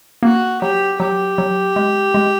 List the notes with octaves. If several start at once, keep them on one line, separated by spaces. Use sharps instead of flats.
A#3 F#4
F#3 G4
F#3 G4
F#3
G#3
G#3